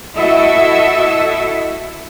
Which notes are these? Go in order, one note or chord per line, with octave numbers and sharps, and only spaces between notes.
E4 F#4 A4 D#5 E5